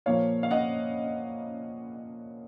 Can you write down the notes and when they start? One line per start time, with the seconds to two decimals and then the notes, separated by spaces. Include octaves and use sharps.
0.06 A#2 F3 A#3 C#5 F5
0.43 F5
0.51 D#5 F#5